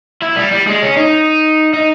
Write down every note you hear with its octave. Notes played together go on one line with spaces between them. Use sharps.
E4
G3
G3
G#3
C#4
D#4
D#4